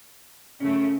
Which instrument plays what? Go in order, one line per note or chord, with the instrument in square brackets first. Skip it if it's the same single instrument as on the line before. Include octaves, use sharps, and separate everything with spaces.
[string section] F#2 C#3 A3 [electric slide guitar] C#4